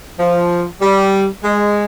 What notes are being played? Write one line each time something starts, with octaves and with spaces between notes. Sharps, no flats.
F3
G3
G#3